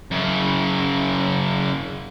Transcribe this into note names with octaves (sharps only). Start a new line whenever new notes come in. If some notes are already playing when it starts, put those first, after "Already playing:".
F#2 C#3